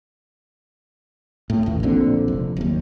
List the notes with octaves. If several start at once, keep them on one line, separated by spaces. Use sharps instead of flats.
A2
A1 D#2
A#1 A#2 D3 C4
F1
F#1 D#2